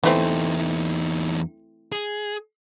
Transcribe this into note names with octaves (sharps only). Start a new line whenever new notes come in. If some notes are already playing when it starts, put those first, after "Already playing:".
E2 E3 A3 C4 D#4
G#4